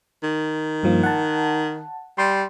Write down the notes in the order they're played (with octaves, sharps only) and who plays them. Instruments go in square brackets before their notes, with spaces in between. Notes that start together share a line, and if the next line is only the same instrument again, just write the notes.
[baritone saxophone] D#3
[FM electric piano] G2 F3 A#3
F#5 A5
[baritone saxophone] G3 [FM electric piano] C6